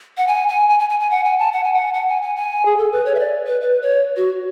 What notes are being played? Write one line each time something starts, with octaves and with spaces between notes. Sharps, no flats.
F#5
G#5
G#5
G#5
G#5
G#5
G#5
F#5
G#5
A5
F#5
G#5
F#5
F#5
G#5
G#5
G#5
G#4
A4
B4
C#5
E5
D5
B4
B4
C#5
F#4